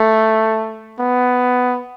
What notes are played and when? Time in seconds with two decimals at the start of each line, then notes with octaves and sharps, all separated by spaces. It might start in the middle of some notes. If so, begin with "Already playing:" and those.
Already playing: A3
0.99 B3